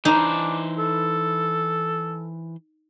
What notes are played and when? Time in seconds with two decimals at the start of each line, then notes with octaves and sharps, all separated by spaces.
0.05 E3 D4 D#4 C5
0.78 A4